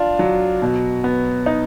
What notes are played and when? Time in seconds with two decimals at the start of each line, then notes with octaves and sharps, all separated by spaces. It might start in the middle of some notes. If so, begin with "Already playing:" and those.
Already playing: D4 F4
0.19 F#3
0.62 B2
1.04 B3
1.46 D#4